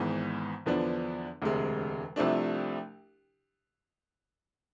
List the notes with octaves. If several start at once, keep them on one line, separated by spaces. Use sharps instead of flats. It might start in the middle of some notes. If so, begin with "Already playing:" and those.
Already playing: G#1 G#2 E3 B3
E2 D3 F3 B3 D4
E1 D2 C3 G#3
C2 C3 F3 A3 D4